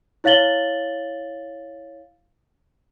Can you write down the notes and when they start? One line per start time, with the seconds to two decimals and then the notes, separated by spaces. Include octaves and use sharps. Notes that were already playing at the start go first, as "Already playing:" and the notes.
0.24 E4 C#5 F5 A6 F#7 G7